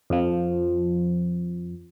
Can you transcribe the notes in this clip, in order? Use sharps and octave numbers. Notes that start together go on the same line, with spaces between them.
F2 F3